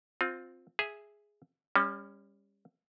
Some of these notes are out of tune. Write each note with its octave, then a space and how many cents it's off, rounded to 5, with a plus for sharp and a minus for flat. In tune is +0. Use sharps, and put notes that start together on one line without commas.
C4 +0 F4 +20
G#4 +0 E5 +0
G3 +35 C#4 +0